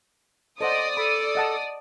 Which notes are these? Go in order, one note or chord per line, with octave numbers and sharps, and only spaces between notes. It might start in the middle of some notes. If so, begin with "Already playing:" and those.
A4 C5 D5 D#5 F#5 D#6
A4 B5
D#5 F#5 A5